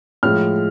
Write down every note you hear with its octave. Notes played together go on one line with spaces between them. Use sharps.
A2 F3 G#3 F6